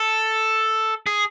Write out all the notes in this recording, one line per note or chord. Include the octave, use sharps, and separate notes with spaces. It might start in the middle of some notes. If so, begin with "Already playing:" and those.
Already playing: A4
G#4